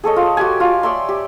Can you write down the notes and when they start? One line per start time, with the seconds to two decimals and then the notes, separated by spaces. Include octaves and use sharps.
0.04 G#4 A4 C#5 D#5
0.16 F4
0.37 F#4 G4 G#5
0.60 F4
0.83 C#5 D5 E5 C6
1.09 G4